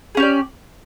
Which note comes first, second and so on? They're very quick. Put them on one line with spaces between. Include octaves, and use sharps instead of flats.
G#4 C#4 G4 D5